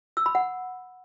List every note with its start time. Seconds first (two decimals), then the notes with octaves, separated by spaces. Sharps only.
0.17 E6
0.26 B5
0.35 F#5